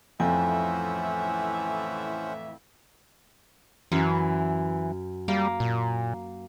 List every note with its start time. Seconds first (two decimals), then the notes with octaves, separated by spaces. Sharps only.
0.20 F2 A2 E3 C#4 C5 E5 F#5 G#5
3.92 F#2 E3
5.28 G3 A#3
5.60 A#2